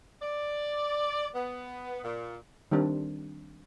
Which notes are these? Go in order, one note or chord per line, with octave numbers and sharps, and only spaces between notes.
D5
B3
A#2
D#3 G3 C4 D4